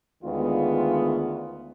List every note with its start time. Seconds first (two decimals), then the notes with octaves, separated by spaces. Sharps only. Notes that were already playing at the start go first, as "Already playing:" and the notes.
0.24 D2 D#3 G#3 B3 F4